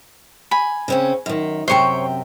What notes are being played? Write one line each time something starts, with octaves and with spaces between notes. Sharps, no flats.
G#5 B5
C#3 C4 C#4
F#2 D#3
F#2 C3 C5 C#5 G5 C#6